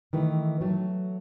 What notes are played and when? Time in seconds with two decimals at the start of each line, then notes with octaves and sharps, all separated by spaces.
0.13 D#3 E3 A3
0.61 F#3 A3